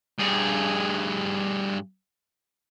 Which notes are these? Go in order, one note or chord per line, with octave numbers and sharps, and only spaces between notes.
G2 G#4